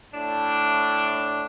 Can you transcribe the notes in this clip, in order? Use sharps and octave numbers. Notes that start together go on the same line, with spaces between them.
A2 D4